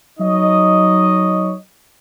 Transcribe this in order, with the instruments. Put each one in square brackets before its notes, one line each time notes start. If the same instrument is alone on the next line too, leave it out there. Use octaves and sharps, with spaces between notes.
[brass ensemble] F#3 D#4 C#5 D#5